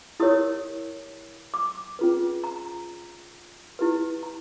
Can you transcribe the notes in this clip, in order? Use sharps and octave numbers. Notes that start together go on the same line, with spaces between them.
E4 G4 A#4 C#5 D#6
D6
C#4 F4 G#4 B4
A#5
E4 G4 B4
A#5